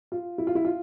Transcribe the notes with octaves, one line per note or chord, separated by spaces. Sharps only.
F4
E4
F4
E4
F4